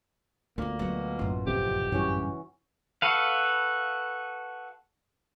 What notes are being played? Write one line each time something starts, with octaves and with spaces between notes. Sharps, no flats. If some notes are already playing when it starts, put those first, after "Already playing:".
D2 A#2 A#3 B3 C#4
B2 F#3 G#3 F#5
A1 F#2 F4
F#1 F2 C3 G4
G2 C#3 E3 F#3 C#4 F#4
F#4 A4 B4 F5